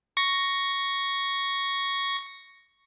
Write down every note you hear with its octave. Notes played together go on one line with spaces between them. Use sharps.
C#6 A#6